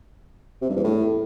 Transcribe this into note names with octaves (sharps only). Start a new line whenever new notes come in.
C3
G2
E2
A2